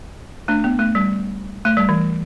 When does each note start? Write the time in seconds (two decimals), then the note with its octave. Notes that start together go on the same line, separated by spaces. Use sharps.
0.48 A3 D4
0.64 B3
0.79 A3
0.95 G3
1.65 A3
1.77 G3
1.89 E3